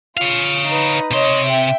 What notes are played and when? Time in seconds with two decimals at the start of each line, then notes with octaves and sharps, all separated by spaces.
0.17 F4 C#5 F5
0.68 D#4 B4
1.11 C3 C#5 D#5 C6
1.47 E5 G5